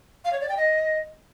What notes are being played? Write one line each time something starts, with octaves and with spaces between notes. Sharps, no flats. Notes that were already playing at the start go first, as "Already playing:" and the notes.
F5
C#5
D5
G5
D#5